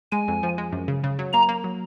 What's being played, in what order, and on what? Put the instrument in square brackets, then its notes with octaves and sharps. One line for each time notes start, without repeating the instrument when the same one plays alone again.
[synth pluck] G#3 [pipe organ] G#5
[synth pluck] F2
F3
G#3
F#2
C#3
C#3
F#3
[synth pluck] A#3 [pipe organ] A#5
[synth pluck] A#3
F#3